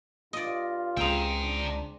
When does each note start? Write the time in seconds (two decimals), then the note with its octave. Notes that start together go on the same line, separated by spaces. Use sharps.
0.33 G2 F4 D5 D#5
0.97 C#2 C4 G#4 G5 A#5
1.43 D4